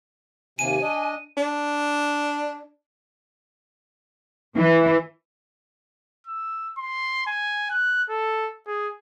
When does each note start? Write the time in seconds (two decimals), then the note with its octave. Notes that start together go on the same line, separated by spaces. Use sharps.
0.59 D#2 C3 G#5 D#7
0.82 D4 D#5
1.37 D4
4.56 E3
6.27 E6
6.78 C6
7.27 G#5
7.71 F#6
8.09 A4
8.67 G#4